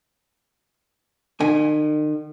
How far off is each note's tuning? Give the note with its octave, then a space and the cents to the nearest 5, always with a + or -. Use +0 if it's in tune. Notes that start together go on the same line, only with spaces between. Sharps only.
D#3 -40 G#5 +0